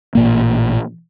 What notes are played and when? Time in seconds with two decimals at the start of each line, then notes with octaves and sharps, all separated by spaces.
0.15 A1 A#2 A#3